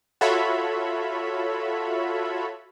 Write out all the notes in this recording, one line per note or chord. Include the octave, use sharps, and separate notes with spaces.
F4 F#4 A4 C#5 E5 B5